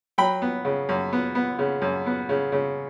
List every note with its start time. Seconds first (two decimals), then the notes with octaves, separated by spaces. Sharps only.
0.18 F#3 G5 B5
0.42 B3
0.65 C#3
0.89 F#2
1.13 B3
1.35 B3
1.59 C#3
1.82 F#2
2.06 B3
2.29 C#3
2.52 C#3